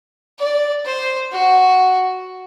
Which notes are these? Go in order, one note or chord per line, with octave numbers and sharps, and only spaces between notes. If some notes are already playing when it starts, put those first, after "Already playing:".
D5
C5
F#4